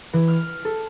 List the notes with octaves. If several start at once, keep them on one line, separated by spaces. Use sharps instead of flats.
E3
F6
A4